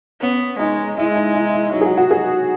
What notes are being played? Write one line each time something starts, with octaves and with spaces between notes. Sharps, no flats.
B3 C#4
G#3 D#4
G#3 E4
D#4
E4
E4
F#3 D#4
G#4
F#4
F#4
F#3 G#4